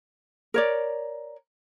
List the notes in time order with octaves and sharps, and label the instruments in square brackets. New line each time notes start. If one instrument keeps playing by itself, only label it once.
[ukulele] A#4 C#5 D5